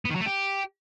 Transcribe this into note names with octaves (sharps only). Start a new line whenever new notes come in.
B3
D#3
F#3
A3
G4